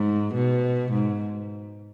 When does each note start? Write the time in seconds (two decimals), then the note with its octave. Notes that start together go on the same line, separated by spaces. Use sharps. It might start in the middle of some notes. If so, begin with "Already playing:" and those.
Already playing: G#2
0.34 B2
0.92 G#2